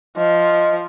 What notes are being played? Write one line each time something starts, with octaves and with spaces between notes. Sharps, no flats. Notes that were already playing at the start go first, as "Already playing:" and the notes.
F3 D#5